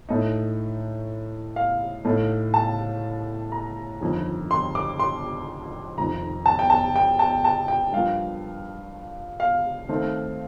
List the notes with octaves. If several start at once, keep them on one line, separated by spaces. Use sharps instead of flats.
A2 A3 D#4
F5
A2 A3 D#4
A5
A#5
G1 F2 D#3
C6
D6
C6
F1 F2 D#3 A#5
A5
G5
A5
G5
A5
A5
G5
G2 F3 A#3 F5
F5
D#2 D#3 A3 C4 D#4